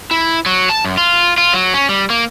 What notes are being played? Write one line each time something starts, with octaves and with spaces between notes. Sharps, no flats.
E4
F#3
A5
F#2
F4
F4
F#3
C#4
G3
A#3